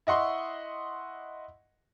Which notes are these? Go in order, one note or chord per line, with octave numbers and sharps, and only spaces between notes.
E4 D#5 F#5 C6 C#6